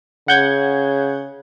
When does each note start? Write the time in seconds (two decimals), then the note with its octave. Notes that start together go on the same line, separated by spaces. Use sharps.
0.28 C#3 F#5 G6 G#6